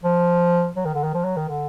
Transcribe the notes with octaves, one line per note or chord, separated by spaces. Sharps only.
F3
F#3
D#3
D3
D#3
F3
F#3
D#3
D3